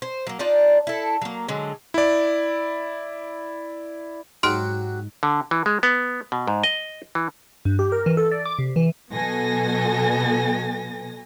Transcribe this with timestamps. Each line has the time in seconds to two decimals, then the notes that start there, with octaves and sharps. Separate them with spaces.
0.02 C5
0.27 F#3 A#3
0.39 D4 D#4 F4 D5
0.87 E4 A4
1.22 F#3 A#3
1.49 D3 F#3 G#3
1.94 E4 D5
4.43 G#2 F#3 F#4 G4 C6 F6 D7
5.23 D3
5.51 E3
5.66 G#3
5.83 B3
6.32 B2
6.48 G#2
6.64 D#5
7.15 E3
7.65 G2
7.79 G4
7.92 A#4
8.06 E3
8.17 A4
8.32 D5
8.45 D6
8.59 C3
8.76 E3
9.13 B2 F#3 B3 A4 G#5 A#6